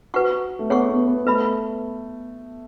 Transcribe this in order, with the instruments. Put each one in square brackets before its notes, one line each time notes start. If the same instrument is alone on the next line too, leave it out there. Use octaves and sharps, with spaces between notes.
[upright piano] F#4 [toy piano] B4 F#5 C#6
[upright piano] A3
[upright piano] B3 [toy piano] G#4 C#5 F#5 C#6
[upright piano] B3
B3
[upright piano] A3 [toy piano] B4 E5 B5